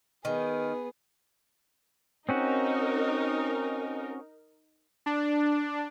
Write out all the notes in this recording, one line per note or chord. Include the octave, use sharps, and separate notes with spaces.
D#3 B3 G#4
C4 C#4 D#4 F#4 A#4
D4